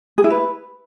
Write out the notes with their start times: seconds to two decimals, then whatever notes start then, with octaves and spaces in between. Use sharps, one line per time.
0.18 G#4
0.24 E4
0.30 B4